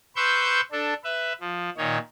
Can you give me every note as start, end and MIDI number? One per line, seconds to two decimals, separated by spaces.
0.16 0.61 71
0.16 0.61 72
0.16 0.61 85
0.16 0.61 88
0.16 0.61 91
0.72 0.94 62
0.72 0.94 69
1.04 1.33 71
1.04 1.33 76
1.41 1.70 53
1.77 1.98 46
1.77 1.98 51
1.77 1.98 63
1.77 1.98 73